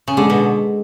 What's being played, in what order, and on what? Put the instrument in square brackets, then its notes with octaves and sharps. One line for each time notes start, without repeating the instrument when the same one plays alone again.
[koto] C#3
[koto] D3 [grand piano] G#3
[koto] B2